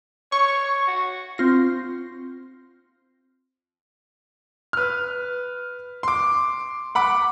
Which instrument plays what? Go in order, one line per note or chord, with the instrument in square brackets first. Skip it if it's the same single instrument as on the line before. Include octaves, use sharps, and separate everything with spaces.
[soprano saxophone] C#5 [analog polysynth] C#6
[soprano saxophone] F#4
[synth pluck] C4 F4 A#6
[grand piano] B4 F6
C6 D6
F#5 B5 D6